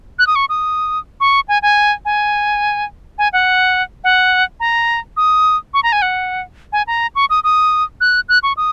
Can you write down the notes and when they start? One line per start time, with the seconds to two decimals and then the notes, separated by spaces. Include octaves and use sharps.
0.19 F#6
0.27 D#6
0.35 C#6
0.49 D#6
1.20 C#6
1.48 G#5
1.62 G#5
2.05 G#5
3.18 G#5
3.33 F#5
4.04 F#5
4.60 A#5
5.17 D#6
5.74 C#6
5.83 A#5
5.92 G#5
6.02 F#5
6.72 G#5
6.87 A#5
7.15 C#6
7.30 D#6
7.44 D#6
8.01 F#6
8.29 F#6
8.43 C#6
8.57 D#6